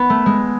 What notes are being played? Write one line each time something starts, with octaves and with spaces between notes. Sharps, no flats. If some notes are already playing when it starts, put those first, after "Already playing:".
Already playing: B3
A3
G#3